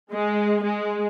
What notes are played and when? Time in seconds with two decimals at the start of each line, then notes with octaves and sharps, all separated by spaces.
0.13 G#3
0.63 G#3